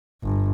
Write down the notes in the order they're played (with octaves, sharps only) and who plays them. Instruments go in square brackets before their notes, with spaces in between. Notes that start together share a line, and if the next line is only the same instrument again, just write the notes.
[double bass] G1